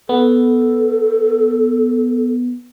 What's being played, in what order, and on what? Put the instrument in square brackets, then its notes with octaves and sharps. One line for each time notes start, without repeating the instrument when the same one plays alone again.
[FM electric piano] B3 [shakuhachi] A4